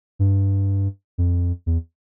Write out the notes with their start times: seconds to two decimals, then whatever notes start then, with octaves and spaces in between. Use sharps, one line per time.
0.19 G2
1.18 F2
1.66 E2